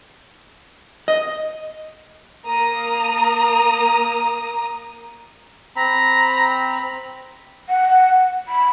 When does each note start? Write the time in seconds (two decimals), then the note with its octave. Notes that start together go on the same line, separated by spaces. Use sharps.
1.08 D#5
2.46 A#3 A#5 D#6
5.76 C4 A#5 B5
7.69 F#5
8.48 B5